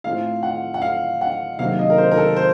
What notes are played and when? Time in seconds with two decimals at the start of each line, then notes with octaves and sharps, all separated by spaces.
0.04 A2 A3 C4 F4 F5
0.43 F#5
0.74 F#5
0.82 F5
1.21 F#5
1.59 C3 D#3 F#3 A#3 F5
1.79 D#5
1.90 A#4
1.98 C5
2.11 A#4
2.17 A4
2.36 C5